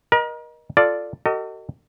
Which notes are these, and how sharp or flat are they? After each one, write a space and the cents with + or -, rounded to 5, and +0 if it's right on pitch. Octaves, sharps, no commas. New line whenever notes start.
A#4 +35 D#5 -10
F4 +0 A4 +0 D5 +0
F#4 +45 A4 +45 D#5 +0